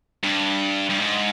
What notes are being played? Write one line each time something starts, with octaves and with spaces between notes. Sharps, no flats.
G2
G2
G#2